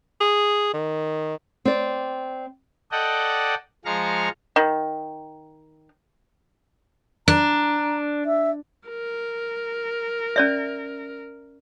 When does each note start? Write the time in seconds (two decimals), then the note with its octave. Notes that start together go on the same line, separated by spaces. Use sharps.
0.21 G#4
0.73 D#3
1.65 C4 D5
2.92 A4 D5 D#5 F#5 G5
3.85 F3 G#3 F5 A#5 C#6 F6
4.56 D#3
7.28 D4 A#5
8.26 E5
8.89 A#4
10.36 C#4 D5 E5